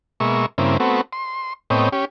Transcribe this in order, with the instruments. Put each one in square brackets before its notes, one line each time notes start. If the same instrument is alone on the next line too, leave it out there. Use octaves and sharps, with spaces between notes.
[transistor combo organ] B2 G#3 A#3 E5 C#6
G2 C#3 A#3 C4 E4
A3 B3 C4 F#4
C6
A2 B3 C4 C#5 D#5 G5
C#4 G4